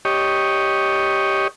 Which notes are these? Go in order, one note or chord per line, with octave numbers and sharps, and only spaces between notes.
G4 C#5 D#5